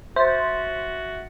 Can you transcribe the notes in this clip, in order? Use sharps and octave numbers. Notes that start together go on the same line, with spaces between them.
F#4 C5 E5 A6